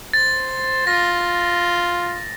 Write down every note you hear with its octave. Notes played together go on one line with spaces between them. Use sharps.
C5 A6
F4 A#6